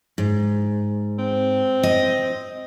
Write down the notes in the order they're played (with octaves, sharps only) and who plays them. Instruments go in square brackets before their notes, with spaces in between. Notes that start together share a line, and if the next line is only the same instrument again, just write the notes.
[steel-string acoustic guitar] G#2
[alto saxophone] C4
[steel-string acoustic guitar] D#5